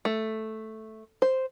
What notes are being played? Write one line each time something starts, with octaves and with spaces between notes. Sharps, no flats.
A3
C5